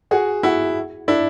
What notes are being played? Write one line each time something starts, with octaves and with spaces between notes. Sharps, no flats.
F#4 G#4
E4 F#4
D4 E4